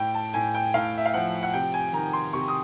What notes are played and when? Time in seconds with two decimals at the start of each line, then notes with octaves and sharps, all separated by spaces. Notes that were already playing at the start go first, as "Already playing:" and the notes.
Already playing: A2 G5
0.15 A5
0.34 A2 G#5
0.55 G5
0.74 A2 F5
0.98 E5
1.06 F5
1.14 F3 F#5
1.43 F#5
1.54 C3 G5
1.74 G#5
1.93 D#3 A#5
2.13 C6
2.33 C3 C#6
2.48 D#6